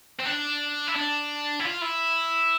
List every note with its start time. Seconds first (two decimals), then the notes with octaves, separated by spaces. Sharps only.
0.19 C4
0.25 D4
0.88 E4
0.96 D4
1.60 E4
1.65 F4
1.82 E4